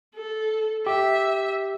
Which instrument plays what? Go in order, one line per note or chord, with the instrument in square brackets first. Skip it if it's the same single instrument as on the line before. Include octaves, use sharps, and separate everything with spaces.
[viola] A4
[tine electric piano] G4 [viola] E5